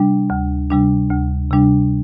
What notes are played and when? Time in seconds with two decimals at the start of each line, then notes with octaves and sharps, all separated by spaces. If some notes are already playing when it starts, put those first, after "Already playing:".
Already playing: C3 G3 D4
0.30 D2
0.70 C3 G3 D4
1.10 D2
1.51 C3 G3 D4